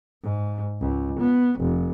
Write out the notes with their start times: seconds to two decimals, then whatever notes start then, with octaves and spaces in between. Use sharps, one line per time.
0.23 G#2
0.80 C#2
1.19 B3
1.60 F1